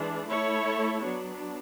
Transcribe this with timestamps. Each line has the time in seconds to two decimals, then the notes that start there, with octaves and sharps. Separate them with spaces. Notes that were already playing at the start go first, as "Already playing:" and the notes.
Already playing: E3 G#3 D4
0.26 A3 E4 A4 C#5
1.03 F#3 B3 D4